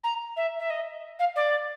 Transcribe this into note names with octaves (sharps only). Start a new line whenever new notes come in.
A#5
E5
E5
D#5
F5
D5